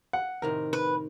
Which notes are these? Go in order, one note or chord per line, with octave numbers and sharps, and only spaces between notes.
F#5
A2 C3 D#3 A#4
B4